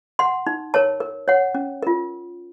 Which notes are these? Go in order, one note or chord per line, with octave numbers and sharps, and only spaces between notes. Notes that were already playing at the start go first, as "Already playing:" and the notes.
F#5 C6
D#4
A#4 C#5 A5
A#4
C#5 F#5
C#4
F4 A#4